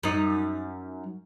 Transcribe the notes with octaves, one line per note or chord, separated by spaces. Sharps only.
F#2 D#4